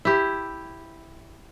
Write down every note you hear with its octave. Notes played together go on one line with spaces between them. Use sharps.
E4 G4